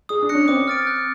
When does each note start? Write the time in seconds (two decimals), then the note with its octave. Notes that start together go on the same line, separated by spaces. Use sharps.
0.09 G#4 D#6
0.22 D4
0.29 F#6 A#6 C#7
0.35 C#4
0.48 C4 D6
0.68 F6 A6 D7
0.87 F#6